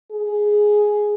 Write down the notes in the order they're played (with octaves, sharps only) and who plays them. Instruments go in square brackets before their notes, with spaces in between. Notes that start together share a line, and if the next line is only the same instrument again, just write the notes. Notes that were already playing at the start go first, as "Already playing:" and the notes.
[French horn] G#4